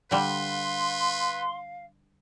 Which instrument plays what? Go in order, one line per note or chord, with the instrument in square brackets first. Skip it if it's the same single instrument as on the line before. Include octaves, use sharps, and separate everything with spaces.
[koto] D3 G3 [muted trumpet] B4 [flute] F5 [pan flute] C6